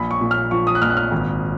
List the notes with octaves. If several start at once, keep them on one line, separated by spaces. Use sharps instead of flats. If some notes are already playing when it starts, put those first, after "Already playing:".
Already playing: A#1 B5
C#6
A#2
F6
F3 C#6
D#6
F#6
A#1 F6
F#6
F6
G#1